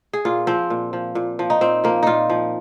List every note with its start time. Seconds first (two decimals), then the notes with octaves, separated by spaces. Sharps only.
0.13 G#4
0.25 A#2 F4
0.47 F3 C4
0.70 A#2
0.93 F3
1.15 A#2
1.39 F3
1.50 D#4
1.61 A#2 C4
1.84 F3 A#3
2.03 A#2 D#4 F4
2.30 F3